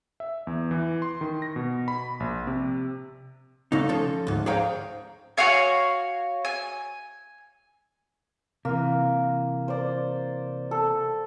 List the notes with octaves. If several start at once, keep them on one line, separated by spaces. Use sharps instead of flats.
E5
E2
E3
C6
D#3
A#6
B2
B5
A#1
C3
C#3 A3 D#4
F3 C#4 A4
D2 G#2
G#4 C5 C#5 F5 G5 A#5
F#4 C#5 F5 G#5
G#5
C3 E3 A#3
C5 D5
A4